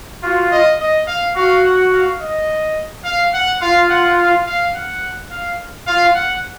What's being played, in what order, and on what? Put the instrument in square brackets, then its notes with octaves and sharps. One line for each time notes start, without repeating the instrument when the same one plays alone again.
[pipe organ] F4 [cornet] F#4
[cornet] D#5
D#5
F5
[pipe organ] F#4 [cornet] F5
[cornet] F#5
F5
D#5
F5
F#5
[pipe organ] F4 [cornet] F5
[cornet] F#5
F5
F5
F#5
F5
[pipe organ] F4 [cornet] F5
[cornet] F#5